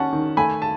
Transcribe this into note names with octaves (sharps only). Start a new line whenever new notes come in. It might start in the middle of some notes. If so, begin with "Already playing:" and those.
Already playing: D#3 C#4 F#5 A5
D#3
A3 G#5 B5
A5